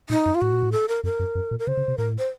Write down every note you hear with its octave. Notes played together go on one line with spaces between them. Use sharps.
A#2 D#4
F#2
F4
A2 F#4
A#2
A2
A4
A#4
F#2 A#4
F#2
F#2
A#2
A#4
C#3 C5
C#3
C3
A2 A#4
C5